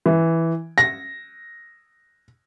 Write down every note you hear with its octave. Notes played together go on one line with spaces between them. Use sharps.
E3
A#6